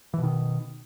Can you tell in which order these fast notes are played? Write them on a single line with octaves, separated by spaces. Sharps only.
E3 B2 D#3